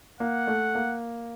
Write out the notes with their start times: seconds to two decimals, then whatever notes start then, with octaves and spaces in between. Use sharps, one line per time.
0.20 A#3 F#5
0.47 A3
0.75 A#3